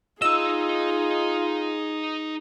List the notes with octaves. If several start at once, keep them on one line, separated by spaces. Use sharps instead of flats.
D#4 F4 G#4 D#5 E6